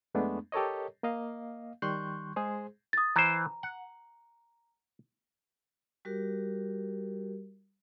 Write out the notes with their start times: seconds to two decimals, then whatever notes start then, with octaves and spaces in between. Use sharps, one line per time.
0.14 F2 G#3 A3 B3 D4
0.52 G4 A4 A#4 C#5 D#5
1.03 A#3 D#5 F5
1.82 D#3 G3 C6 C#6 F#6 G6
2.36 G#3 G#4 C5
2.93 D#6 A6
3.16 E3 C5 A#5
3.63 F#5
6.05 G3 F#4 G4 A#4